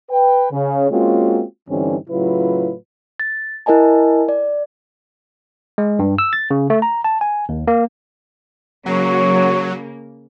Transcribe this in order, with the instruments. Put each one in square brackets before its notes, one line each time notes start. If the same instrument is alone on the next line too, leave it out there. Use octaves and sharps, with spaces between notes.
[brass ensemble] B4 G5
C#3
G#3 A#3 C4 C#4 F4 F#4
G2 D3 E3 C4 C#4 D#4
A2 C#3 F#3 E4 F4 B4
[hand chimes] A6
E4 A#4 D#5 G#5 A5
D5
[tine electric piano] G#3
G2
E6
A6
C#3
A3
A#5
A5
G#5
D#2
A#3
[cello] C#3 A#3 [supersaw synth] F#3 [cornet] C#5